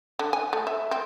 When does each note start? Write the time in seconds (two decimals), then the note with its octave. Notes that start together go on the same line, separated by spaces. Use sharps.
0.19 D3
0.33 G#5
0.53 A3
0.67 E5
0.91 C4